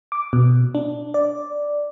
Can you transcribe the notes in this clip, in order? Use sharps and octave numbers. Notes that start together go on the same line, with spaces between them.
D6
B2
D4
D5